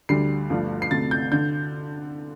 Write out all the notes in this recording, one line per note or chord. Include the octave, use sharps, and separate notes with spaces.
D2 D3 G3 C7
G1 G2 F3 A3
C7
D2 C3 A3 A6
G6
D3 G6